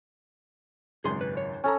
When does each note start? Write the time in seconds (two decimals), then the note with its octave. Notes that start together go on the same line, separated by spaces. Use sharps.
1.04 G#1 C#2 F#2 G#4 C6
1.21 B4
1.37 C#5
1.64 C#4 A4 A#5 C#6